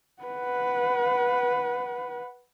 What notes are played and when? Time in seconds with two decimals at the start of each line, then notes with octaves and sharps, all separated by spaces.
0.22 B4 F#5